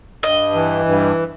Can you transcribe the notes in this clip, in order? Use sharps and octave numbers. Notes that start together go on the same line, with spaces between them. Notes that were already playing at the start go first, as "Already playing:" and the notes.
G2 D#5
E3
G2